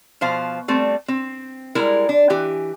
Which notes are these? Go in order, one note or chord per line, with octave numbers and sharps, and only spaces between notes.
B2 F3 C5 F5
G3 A3 C4
C4
G3 G#3 E4 A#4
D4
E3 G4 G#5